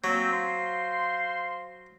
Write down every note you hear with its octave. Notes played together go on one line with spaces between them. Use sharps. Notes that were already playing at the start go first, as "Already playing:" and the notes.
F#3 A#3 C4
C5 F5 C6